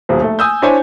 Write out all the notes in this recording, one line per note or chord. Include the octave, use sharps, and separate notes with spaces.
D#1 B1 F3
A3
G#5 D#6 E6 G6
D4 E4 C5 C#5 E5 G#5